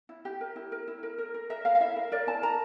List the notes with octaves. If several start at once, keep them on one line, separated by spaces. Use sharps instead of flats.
E4
G4
A#4
E4
A#4
E4
A#4
A#4
A#4
A#4 E5
A#4 F5
F5
E4 E5
A#4
A#4 D5
E4 A5
A#4 A#5